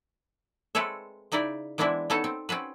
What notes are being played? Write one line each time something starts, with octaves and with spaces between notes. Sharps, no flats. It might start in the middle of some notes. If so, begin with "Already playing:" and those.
G#3 C4 A4 B4 C#5 E5
C#3 D#4 E4 D5 G5
E3 G#3 B3 C4 D4 E4
B3 C#4 D#4 A4 C#5 A5
C4
C4 C#4 F#4 B4